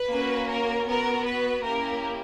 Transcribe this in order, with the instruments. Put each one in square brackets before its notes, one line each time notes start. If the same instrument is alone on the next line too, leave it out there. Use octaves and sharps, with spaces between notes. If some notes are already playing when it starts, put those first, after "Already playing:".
Already playing: [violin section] B4
A#3 C#4 F#4
A#4
B3 F#4 A#4
B4
A#3 C#4 E4 G4 A#4